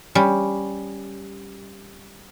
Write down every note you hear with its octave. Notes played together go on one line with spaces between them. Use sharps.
G3 C#4